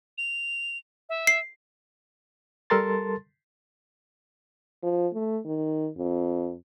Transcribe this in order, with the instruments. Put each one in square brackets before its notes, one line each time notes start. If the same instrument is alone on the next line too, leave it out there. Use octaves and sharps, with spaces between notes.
[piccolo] F7
E5
[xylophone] C7
[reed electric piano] G3 A4 A#4 A5 C6 A6
[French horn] F3
A3
D#3
F2